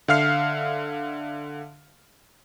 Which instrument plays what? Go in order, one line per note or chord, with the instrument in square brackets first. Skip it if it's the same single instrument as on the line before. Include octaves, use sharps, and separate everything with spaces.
[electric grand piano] D3 E5 F5 F6 C7